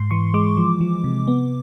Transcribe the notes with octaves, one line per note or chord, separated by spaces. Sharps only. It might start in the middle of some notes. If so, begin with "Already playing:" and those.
Already playing: G#2 C6
E3 C#6
G#3 D6
F3
F3
C3
B3